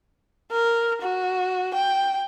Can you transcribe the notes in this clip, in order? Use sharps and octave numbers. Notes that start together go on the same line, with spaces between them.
A#4
F#4
G5